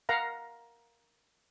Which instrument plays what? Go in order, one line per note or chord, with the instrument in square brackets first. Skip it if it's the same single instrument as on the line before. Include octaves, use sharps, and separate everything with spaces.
[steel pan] A#4 F5 F#5 A#5